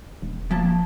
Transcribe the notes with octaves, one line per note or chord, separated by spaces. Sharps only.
E1
F3 A#3 A5